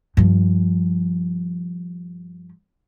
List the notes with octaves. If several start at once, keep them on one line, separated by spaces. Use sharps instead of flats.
G2 F3